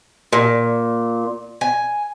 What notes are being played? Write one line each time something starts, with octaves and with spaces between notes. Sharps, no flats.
A#2
G#5